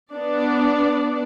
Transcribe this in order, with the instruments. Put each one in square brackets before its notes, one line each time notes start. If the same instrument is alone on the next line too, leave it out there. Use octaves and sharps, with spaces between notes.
[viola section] B3 D4 D5